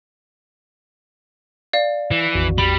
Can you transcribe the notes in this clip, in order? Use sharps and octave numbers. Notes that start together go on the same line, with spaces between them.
D5 F5
E3
A#1 F2 F#4
G3 B5